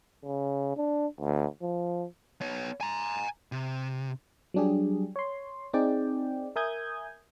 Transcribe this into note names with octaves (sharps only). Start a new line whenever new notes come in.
C#3
D4
D2
F3
B3 C#5
G#5 A#5
C3
F#3 G3 D4 G4 G#4
C#5 C6
C4 D#4 G#4 D5 G5
A#4 E5 G#5 D#6 G6 G#6